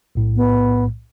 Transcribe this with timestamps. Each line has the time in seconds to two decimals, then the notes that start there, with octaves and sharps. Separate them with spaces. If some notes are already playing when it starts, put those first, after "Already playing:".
0.15 B1 A2
0.36 B3